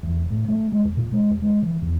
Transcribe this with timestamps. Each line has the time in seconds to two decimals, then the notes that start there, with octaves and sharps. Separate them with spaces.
0.03 E2
0.18 F1
0.30 A2
0.48 A3
0.72 G#3
0.85 D#2
0.97 A#2
1.12 G#3
1.31 D#2
1.42 G#3
1.62 E3
1.82 E2